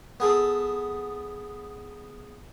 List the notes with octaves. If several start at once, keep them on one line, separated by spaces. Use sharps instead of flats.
B3 G#4 A4